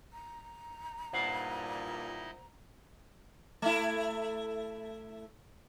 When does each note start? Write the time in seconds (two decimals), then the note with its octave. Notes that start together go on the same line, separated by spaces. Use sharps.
0.13 A#5
1.13 G2 A#2 D#4 E4 C5 D#5 F#5
3.62 A3 E4